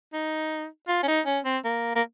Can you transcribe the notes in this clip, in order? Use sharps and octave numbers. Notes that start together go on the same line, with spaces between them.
D#4
F4
C#4
D#4
C#4
C4
A#3
A#3